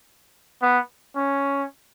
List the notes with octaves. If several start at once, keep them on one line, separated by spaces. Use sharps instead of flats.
B3
C#4